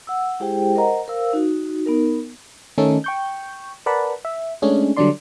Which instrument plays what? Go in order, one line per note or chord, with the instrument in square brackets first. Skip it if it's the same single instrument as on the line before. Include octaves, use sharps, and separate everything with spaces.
[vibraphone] F#5 E6
G#3 E4 G4 G#4 C5 G5
A#4 C5 D#5 F#5 A#5
A#4 C5 F5 E6
D#4 F#4
B3 D#4 A#4
[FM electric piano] D#3 A3 C#4 D#4 A4
G5 C#6 G6
A#4 B4 D5 F#5 A5 B5
E5
G#3 A3 C#4 D4 G#4
D3 F#3 G3 D4 D5 C6